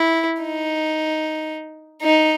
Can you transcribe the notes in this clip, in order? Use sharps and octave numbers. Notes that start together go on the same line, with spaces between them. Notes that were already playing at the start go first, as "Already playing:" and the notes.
Already playing: E4
D#4
D#4